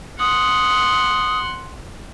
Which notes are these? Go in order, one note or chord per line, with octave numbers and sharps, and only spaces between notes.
F#5 C6 D#6